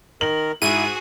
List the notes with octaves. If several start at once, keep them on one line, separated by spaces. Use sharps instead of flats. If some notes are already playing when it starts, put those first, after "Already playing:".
D#3 A#4 F#7
G#2 E4 F#4 G#4 D#7